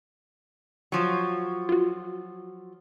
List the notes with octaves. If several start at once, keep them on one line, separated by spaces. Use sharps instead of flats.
F3 F#3
F4 F#4